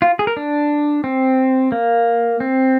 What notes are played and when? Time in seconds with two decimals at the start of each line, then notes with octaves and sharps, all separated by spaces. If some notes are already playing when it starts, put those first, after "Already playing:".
0.02 F4
0.19 G#4
0.27 A#4
0.37 D4
1.04 C4
1.72 A#3
2.40 C4